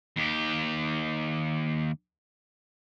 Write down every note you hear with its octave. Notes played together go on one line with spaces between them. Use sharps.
D#2 G4